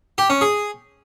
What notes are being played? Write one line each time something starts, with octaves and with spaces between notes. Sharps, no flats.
G4
C#4
G#4